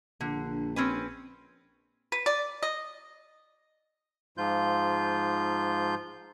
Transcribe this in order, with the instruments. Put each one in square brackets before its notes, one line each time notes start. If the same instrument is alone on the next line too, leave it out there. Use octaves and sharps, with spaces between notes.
[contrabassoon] A#1 [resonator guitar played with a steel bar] D3
[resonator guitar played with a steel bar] C4 C#4 B4
[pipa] B4
D5
D#5
[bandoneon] G#2 F3 F4 G6